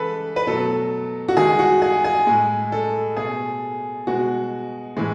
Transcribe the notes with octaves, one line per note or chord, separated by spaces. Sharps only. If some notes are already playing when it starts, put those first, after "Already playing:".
Already playing: C#3 E3 G#3 A4 B4
B4
B2 F#3 A3 A4
F#4
D#3 G#3 G#4
F#4
G#4
G#4
A2 G#3
A4
B2 A3 G#4
B2 G#3 F#4
A2 E3 G#3